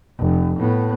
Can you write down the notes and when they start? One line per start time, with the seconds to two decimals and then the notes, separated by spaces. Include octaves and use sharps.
0.19 F1
0.59 A2 B3